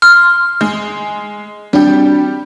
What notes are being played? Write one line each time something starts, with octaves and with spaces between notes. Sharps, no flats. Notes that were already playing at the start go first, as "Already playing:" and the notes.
C6 F6
G#3
G3 C4 D4 F#4 G4